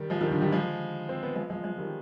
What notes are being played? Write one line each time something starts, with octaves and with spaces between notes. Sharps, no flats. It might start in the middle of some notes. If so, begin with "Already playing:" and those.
Already playing: D#3 G3
F3 G#3
D#3 G3
D3 F3
D#3 G3
F3 G#3
C4
B3
F3 G#3
F3 G#3
F3 G#3
D#3 G3